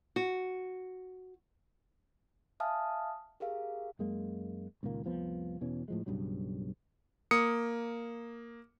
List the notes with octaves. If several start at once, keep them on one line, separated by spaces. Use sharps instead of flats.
F#4
E5 F5 G#5 A5 D#6 F6
G4 G#4 A#4 F5
F#2 G#3 A#3
C#2 A#2 D#3 A#3
F1 C2 F3 B3
E2 B2 E3 C#4
A2 F3 G#3
B1 G2 C#3 F#3
A#3 D#6 C#7